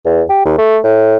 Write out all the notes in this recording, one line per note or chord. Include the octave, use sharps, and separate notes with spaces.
E2
G4
D#2
A3
A2